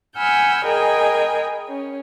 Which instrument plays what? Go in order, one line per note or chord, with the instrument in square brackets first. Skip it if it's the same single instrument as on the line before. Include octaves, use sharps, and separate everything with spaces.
[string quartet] F#5 G#5 B5 E6 F6 G6
G#4 A#4 D#5 G5 G#5 B5
C#4